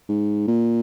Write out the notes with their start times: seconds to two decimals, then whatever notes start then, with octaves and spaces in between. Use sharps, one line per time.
0.09 G#2
0.47 A#2